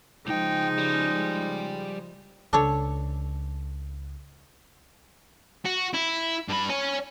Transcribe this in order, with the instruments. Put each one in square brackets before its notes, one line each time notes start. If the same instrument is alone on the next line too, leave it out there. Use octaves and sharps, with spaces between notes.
[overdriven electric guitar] C#2 G5 [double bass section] C#3 F3 G#3 [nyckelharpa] D#4
[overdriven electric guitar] G3
[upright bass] C#2 [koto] D4 A4 C#5
[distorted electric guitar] F#4
E4
G2 B5
C#5 G#5